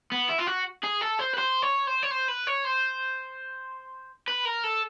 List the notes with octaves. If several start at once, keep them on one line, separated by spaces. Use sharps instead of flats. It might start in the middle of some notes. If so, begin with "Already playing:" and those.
B3
E4
F4
F#4
G#4
A4
C5
B4
C5
C#5
C5
C#5
C5
B4
C#5
C5
B4
A#4
A4